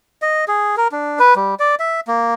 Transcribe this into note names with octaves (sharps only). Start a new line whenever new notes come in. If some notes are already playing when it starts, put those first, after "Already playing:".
D#5
G#4
A#4
D4
B4
G3
D5
E5
A#3